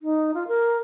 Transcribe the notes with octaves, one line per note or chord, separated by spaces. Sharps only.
D#4
F4
A#4